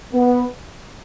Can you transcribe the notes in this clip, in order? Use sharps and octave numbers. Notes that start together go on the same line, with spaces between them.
B3